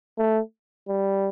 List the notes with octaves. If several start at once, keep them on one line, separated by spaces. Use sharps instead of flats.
A3
G3